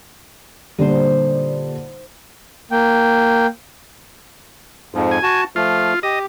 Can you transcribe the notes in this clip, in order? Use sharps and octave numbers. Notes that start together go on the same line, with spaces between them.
A#2 D3 G3 D#4 C5
A#3 G5
F2 G#2 F3
G#5
F#4 A5
F3 A3 F4
G4 D#5